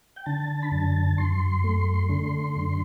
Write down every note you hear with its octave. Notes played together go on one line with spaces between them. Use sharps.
G5
D3 A5
B5
F#2 A5
F#2 C6
A3
D3
F#2